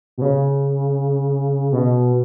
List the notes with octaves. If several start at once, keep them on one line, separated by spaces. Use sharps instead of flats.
B2
C#3
B2